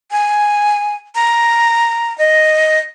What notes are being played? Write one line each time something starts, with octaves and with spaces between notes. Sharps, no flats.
G#5
A#5
D#5